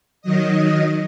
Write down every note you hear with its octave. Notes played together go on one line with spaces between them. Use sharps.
D#3 F#3 D#5